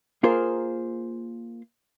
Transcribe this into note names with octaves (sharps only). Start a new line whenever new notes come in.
A#3 F4 G#4 A#4 C5